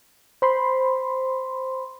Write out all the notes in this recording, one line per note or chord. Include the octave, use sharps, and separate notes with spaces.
C5 B5 C6